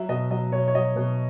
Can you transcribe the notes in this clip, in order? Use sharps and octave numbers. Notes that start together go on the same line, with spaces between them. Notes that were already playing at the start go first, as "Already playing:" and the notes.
Already playing: F#3 E5
B2 D#5
F#3 D#5
B2 C#5
C#5
F#3 D#5
B2